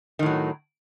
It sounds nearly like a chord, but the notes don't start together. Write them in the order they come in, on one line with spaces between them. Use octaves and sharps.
D#3 A2 F#3